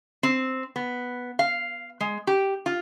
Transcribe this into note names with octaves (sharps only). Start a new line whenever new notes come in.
C4
B3
F5
G#3
G4
F4